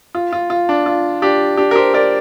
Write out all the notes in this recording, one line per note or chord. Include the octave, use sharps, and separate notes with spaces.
F4
F4
F4
D4
F4
D4 G4
D4 G4
A#4
G4 C5
A#4 D5